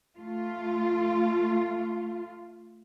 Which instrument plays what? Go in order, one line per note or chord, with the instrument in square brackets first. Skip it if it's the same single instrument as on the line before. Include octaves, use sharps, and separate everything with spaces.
[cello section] A3 F4